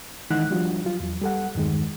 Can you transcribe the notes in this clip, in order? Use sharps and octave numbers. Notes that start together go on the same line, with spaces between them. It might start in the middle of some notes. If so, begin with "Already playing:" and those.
D#3 E3 G#3 D#4 F#5 F#6
F3 G3 D4 F4 F#4
F#3 F4
E2 F#3
G3 A4 F#5
E2 G2 D#3 G#3